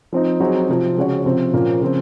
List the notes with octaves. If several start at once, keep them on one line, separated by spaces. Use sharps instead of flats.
F3 C4 D#4
F#3 C4 D#4 G#4
C3 F3 C4
C#3 G#3 C#4 F#4 C#5
C3 F3 C4
A#2 F3 A#3 C#4
C#3 F3 C4